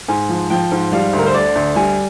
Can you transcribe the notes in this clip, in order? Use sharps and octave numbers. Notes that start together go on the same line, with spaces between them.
G#2 G#5
F3
F3 G5
G#2
G3 F5
D2
A#4
C5
D3 D5
D2
G3 G#5